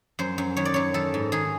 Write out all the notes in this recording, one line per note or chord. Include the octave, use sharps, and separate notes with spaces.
F#2 C5
F#2
D#3 C#5
D5
F#2 C#5
D#3 A4
G#2
D#3 G#4